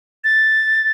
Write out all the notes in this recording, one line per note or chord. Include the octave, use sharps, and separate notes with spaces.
A6